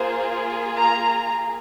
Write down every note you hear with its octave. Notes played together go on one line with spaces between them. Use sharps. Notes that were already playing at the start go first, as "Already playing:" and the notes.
Already playing: A#3 F4 G#4 C5
A#5